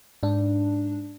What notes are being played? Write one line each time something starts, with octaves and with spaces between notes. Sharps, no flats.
G#2 D4